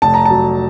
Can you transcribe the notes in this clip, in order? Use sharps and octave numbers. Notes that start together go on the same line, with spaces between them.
F1 A5
A#5
A5
F#3